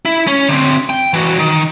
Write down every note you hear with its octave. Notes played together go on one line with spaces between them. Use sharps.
E4
C#4
D3 C4
G5
E3 F#4
D#3